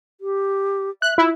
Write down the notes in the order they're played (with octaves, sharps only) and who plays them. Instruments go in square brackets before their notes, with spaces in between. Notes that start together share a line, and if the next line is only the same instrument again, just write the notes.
[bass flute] G4
[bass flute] E5 [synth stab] F#6
[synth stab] E4 [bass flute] F4